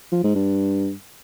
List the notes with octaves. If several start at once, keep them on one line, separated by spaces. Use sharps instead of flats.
F3
G#2
G2